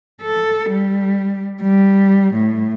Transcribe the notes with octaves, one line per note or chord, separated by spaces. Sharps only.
A4
G3
G3
A2